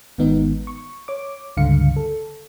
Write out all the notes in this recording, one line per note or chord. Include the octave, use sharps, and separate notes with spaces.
G#1 G#2 D#3 B3 D#4
C#6
C#5 D6
C#2 G2 D3 F5 C#7
A4